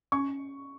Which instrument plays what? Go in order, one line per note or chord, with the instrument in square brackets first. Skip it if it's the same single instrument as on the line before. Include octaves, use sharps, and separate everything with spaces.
[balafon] C#4 [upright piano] C#6